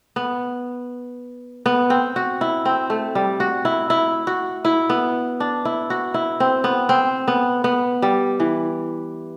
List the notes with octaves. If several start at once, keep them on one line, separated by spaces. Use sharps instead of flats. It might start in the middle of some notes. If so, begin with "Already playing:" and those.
B3
B3
C4
F#4
E4
C4
A3
G3
F#4
E4
E4
F#4
E4
B3
D4
E4
F#4
E4
C4
B3
C4
B3
B3
G3
E3